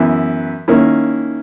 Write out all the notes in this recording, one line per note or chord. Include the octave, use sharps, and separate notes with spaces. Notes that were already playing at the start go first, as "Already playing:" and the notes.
Already playing: F#2 E3 B3 E4
D#3 A#3 C#4 E4